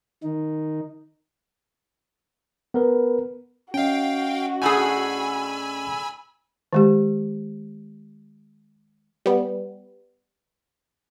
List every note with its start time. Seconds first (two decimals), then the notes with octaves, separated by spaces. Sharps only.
0.23 D#3 D#4
2.74 B3 A#4 B4
3.74 C#4 F#4 D#5 F5 G5
4.62 A2 D4 G#4 G#5 B5 E6
6.73 D#3 G#3 G4
9.26 G3 B3